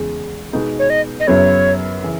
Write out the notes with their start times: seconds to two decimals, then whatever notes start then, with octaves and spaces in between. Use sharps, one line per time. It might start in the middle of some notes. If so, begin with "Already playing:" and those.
Already playing: E2 C#3 G#3
0.53 B2 G#3 B3 D#4
0.79 C#5
0.90 D#5
1.20 D#5
1.27 F#2 C#3 F#3 B3 E4 C#5
2.02 C#3 E3